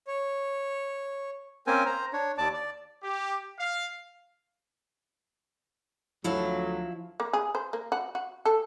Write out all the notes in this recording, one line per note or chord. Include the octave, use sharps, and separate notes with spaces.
C#5
A#3 C4 C#4 A#4 C5 G#5
C5 A#5
D4 C#5
D#2 D5 A5 D6
D5
G4
F5
D2 F3 F#3 E4 F5
A#3
G#4
C5
A#3
F#4
F#4
A4